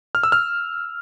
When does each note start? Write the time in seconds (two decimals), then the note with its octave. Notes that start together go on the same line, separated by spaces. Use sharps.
0.15 F6
0.23 E6
0.32 F6